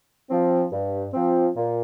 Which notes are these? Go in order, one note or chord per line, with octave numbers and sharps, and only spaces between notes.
F3 C4
G2
F3 C4
A#2